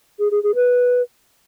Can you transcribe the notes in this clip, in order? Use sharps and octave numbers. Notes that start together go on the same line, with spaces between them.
G#4
G#4
G#4
B4